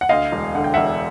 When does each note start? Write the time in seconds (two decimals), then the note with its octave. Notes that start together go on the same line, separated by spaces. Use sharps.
0.01 F#5
0.09 D2 D#5 F5
0.32 E1
0.55 D3 F#5
0.64 G5
0.74 E1 E5 F#5